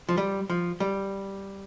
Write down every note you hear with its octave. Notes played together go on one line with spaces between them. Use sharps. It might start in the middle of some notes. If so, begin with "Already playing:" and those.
F3
G3
F3
G3